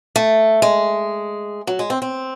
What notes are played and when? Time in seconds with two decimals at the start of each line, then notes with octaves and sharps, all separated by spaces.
0.16 A3
0.62 G#3
1.67 F#3
1.79 G#3
1.90 C4
2.02 C4